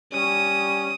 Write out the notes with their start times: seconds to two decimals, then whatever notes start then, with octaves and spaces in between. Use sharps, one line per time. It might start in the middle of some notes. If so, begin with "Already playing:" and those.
0.13 G3 C#4 D#6